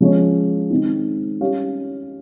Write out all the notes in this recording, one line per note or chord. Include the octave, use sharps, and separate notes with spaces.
F3 G#3 C#4 G#4 C#5
D#3 G#3 C4 D#4
G3 C#4 G4 C#5 F5